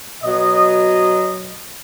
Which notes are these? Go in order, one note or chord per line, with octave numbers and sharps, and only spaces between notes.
B2 F#3 D#5